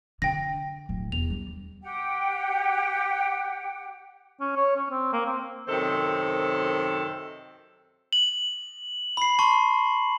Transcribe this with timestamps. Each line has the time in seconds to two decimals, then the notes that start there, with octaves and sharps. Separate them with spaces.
0.22 D3 D4 G5 A#6
0.89 D1
1.12 E2 F7
1.30 G3
1.82 G4 F#5 G5
4.41 C#4
4.56 C#5
4.76 C#4
4.90 C4
5.13 A#3
5.26 C4
5.68 F#2 C3 D#3 C4 A4 C5
8.13 F#7
9.17 B5 C7
9.39 A5 C6 C#6